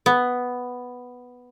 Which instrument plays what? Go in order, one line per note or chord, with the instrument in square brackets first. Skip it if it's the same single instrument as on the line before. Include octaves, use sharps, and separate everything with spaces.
[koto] B3